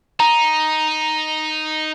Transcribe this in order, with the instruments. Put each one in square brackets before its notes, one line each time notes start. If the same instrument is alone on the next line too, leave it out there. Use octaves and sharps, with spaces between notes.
[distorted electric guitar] D#4 [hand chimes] A#5